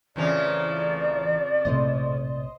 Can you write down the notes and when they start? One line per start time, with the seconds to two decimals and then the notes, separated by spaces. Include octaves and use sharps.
0.16 A1 F2 C#3 E3 F3 D5 A#5
1.65 A#1 A2 C3 C5 D#5